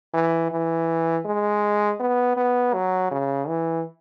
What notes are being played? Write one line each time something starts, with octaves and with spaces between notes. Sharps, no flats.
E3
E3
G#3
B3
B3
F#3
C#3
E3